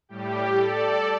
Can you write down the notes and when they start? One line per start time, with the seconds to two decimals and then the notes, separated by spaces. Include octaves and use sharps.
0.09 A2 G3 G4
0.55 A4 D5